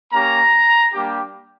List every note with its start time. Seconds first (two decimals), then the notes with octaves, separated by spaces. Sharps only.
0.12 A#3 C#4 G4 A#5
0.94 G3 A#3 D4 G4